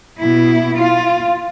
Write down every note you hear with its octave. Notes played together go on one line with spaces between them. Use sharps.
B2 E4
F4